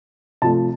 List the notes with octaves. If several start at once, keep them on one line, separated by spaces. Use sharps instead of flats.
C3 F3 A3 A5